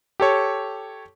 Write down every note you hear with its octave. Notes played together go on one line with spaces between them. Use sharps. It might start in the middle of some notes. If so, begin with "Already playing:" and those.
G4 A4 C#5